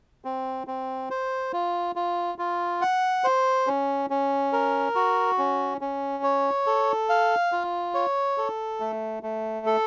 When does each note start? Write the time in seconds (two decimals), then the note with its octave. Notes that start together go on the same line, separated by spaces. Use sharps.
0.25 C4
0.67 C4
1.10 C5
1.53 F4
1.96 F4
2.38 F4
2.81 F#5
3.24 C5
3.67 C#4
4.10 C#4
4.53 A#4
4.95 F#4
5.38 C#4
5.81 C#4
6.23 C#5
6.66 A4
7.09 F5
7.52 F4
7.94 C#5
8.38 A4
8.80 A3
9.23 A3
9.66 A4